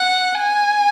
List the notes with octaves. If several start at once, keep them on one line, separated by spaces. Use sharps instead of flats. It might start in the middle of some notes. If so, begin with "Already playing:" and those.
Already playing: F#5
G#5